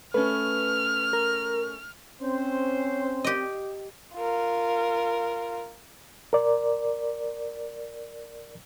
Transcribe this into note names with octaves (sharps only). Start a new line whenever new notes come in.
A3 C#4 B4 F6
A#4
C4 C#4 C5
G4 D#5
F4 A#4
A#4 D5